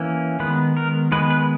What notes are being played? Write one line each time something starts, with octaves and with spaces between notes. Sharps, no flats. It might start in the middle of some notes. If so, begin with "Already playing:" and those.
Already playing: E3 A#3 C#4
D#3 G#3 B3 B4
A#4
D#3 G#3 B3 B4
B4